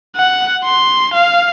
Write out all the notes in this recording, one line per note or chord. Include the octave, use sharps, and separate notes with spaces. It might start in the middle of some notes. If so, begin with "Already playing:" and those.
F#5
C6
F5